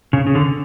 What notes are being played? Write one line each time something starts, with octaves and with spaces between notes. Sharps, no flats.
C#3
C#3
D3